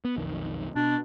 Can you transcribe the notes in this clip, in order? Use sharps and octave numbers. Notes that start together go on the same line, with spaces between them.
B3
B1 F2 D#3
B2 D4